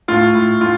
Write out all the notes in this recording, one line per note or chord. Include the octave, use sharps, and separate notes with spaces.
A2 F4
A2
A2 F4